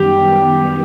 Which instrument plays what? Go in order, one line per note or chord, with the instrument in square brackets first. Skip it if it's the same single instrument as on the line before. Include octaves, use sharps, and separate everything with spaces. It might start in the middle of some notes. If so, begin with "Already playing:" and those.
Already playing: [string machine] F#2 D#3 G3 B3 [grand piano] G4